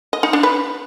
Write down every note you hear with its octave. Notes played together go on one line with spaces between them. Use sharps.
D#5
D#4
D4
B4